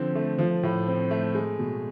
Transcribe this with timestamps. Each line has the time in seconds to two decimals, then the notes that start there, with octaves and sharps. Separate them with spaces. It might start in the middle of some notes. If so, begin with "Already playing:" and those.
Already playing: D3 F3 C4
0.15 A3
0.39 F3
0.63 A2
0.88 C4
1.11 A3
1.35 G#3
1.59 B2